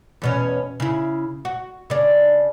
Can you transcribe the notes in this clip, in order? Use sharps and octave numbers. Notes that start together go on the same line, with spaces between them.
E2 B2 C#4
C#3 E4
F#4
C#3 D4